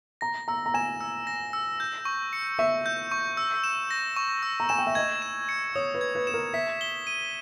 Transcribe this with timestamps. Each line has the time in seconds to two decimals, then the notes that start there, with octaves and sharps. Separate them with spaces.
0.21 A#5 A#6
0.48 A#5 E6
0.66 A#5
0.74 G#5 E7
1.01 E6
1.27 A#6
1.53 E6
1.80 G6
2.05 C#6
2.33 C#7
2.59 E5 C#6
2.86 G6
3.11 C#6
3.37 E6
3.64 E7
3.91 A#6
4.17 C#6
4.43 E6
4.60 A#5
4.69 G#5 E7
4.78 G5
4.87 E5
4.95 D#5 G#6
5.22 E7
5.49 C#7
5.75 C#5 D#6
5.94 B4
6.01 G#6
6.15 B4
6.27 B4 E7
6.34 A#4
6.54 E5 B6
6.81 G7
7.07 D#7